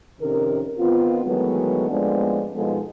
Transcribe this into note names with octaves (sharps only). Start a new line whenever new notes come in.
F2 C3 D#3 C#4 A#4
D#3 B3 C4 F4
D#3 E3 F#3 G#3 A3 B3
A2 F3 G#3 B3 C4 D4
B2 F3 G#3 B3 D#4 A4